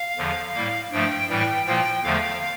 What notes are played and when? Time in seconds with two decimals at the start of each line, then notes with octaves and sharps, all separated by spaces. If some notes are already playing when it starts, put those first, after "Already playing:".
Already playing: F5
0.17 E2 D3 F3
0.54 A2 G3 A#3
0.92 G2 F3 A3 G5
1.29 A2 E3 G3 G5
1.66 A#2 F3 A#3 G5
2.03 E2 D3 F3 A3 F5